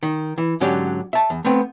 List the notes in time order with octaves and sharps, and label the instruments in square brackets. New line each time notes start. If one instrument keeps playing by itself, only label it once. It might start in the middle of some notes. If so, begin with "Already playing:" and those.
[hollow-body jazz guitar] D#3
E3
G#2 D3 F#3 C#4 D4 G4
E5 A5
E2
A3 B3 C4